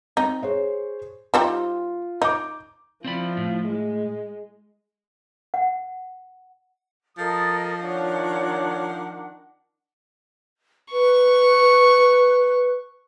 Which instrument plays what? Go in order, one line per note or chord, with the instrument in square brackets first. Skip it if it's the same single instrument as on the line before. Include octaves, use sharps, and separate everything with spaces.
[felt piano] C4 [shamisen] D#4
[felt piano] G#4 C5 C#5
[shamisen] G3 C4 D#4 [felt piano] F4
[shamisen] D#4 [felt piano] D6 G6
[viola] F3 E4 [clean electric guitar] C4 D5 B5
[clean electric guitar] A2
[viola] G#3
[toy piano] F#5
[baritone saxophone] F3 [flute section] A4 A#4 [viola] D#5 [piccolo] A6
[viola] D#3 D4 [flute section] C#5 D5 [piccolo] F#5
[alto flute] B4 [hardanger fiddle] C#6